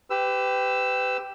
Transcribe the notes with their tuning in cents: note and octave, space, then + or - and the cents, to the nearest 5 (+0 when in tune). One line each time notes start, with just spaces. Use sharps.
G4 +0 B4 +35 E6 +10